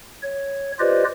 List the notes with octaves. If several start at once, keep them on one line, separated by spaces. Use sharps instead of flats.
C#5
F4 G4 B4 C5 D5 D#5